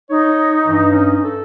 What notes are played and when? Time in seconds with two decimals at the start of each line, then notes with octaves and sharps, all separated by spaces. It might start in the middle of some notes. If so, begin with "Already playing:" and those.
0.10 D#4 C#5
0.67 G2 E3
0.90 C#4
1.24 A4